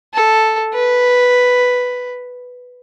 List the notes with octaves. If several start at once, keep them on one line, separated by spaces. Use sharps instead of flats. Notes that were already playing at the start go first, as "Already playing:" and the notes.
A4
B4